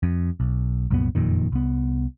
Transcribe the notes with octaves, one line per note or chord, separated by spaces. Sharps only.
F2
B1
C2 F#2 A#2 B3
F#1 F2 A#2 D#3
C2 B3